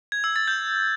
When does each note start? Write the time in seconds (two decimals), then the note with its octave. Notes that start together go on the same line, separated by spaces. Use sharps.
0.12 G#6
0.24 E6
0.36 A6
0.48 G6